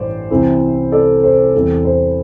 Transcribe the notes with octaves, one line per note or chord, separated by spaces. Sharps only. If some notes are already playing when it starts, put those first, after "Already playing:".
Already playing: A1 G2 E3 C5 D5
C2 C3 E3 C4 E4
A4 D5
C5
E2 E3 G3 C4 E4 A4
C5